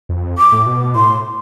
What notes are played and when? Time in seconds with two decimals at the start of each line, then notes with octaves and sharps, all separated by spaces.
0.09 F2
0.38 D6
0.52 A2
0.66 B2
0.95 A2 C6